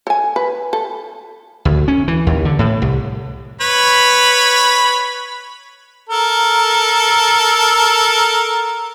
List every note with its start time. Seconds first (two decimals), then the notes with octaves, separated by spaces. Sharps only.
0.07 A4 G#5
0.36 B4
0.73 A4
1.65 D2
1.88 C#4
2.08 E3
2.27 D#2
2.45 D3
2.59 A2
2.82 C2
3.61 B4 C#5 B5
6.09 A4 A#4